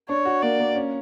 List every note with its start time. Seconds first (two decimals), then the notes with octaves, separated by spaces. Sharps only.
0.09 D4 C#5
0.25 F#4
0.42 A#3 D5
0.60 A#3
0.75 C#4